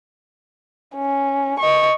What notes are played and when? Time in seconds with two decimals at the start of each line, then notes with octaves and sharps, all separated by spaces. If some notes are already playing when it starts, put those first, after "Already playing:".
0.96 C#4
1.59 D#5 C#6